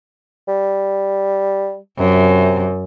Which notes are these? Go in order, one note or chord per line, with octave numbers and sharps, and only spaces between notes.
G3
F#2 C3